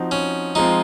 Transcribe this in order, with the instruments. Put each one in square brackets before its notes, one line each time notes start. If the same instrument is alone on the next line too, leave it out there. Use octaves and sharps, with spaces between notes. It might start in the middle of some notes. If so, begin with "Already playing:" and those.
Already playing: [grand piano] F3 C4 D#4 F#4
[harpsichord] C#4
[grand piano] F3 G#3 C4 F4 [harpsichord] D#4